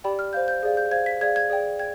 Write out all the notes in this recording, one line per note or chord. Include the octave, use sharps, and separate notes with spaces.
G4 D5 G5 B5
F6
C5 F5 G6
G6
G#4 D5 F5
G6
C5 F5 G#6
B6
G#4 D5 F5 G#6
G#6
G#4 D5 G5
G5 G#6